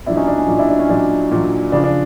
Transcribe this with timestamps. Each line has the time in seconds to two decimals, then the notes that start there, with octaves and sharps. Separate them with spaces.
0.06 A#2 F#3 D4 E4
0.16 C#4 D#4
0.27 D4
0.38 C#4
0.48 A#2 F#3 D4
0.58 D4 E4
0.69 D4
0.79 C#4
0.89 A#2 F#3 D4
1.32 A#2 F#3
1.72 C#3 F3 D4
1.84 D4